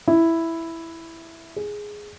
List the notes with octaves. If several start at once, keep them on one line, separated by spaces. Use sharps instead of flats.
E4
G#4